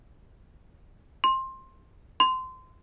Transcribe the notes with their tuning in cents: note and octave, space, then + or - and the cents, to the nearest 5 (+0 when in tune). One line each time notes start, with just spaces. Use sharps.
C6 +15
C6 -20